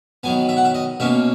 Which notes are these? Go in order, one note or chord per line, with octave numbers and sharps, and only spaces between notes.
D#3 F#3 B3 G#5
E5
F#5
E5
D#5
B2 A#3 C#4 E5